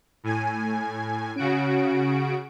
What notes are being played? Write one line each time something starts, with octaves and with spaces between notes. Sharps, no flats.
A2 G#5
C#3 C#4 F#4 D7